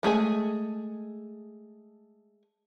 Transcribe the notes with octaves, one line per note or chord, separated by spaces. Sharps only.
G#3 A3 G#4 G#5